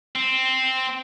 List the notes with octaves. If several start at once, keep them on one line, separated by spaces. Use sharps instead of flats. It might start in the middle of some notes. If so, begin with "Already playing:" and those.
C4